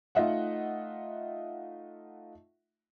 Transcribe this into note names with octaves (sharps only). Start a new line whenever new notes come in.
A3 D#4 F4 D#5 E5 F#5